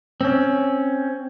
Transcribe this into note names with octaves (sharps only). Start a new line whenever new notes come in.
C4 C#4